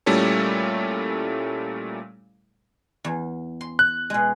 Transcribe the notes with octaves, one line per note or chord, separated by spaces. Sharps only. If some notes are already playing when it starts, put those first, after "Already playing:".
A#2 G3 A3 C#4 E4 A4
E2
C6
F#6
B2 G#3